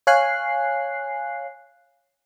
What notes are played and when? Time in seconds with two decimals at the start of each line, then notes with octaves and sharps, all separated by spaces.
0.07 C#5 F5 G#5 F#6 C7